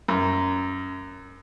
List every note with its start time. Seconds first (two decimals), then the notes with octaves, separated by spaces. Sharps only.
0.08 F#2